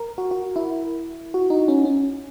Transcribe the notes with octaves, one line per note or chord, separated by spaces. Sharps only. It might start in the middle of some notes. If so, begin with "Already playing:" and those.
Already playing: A#4
F#4
F#4
E4
F#4
D#4
C#4
C#4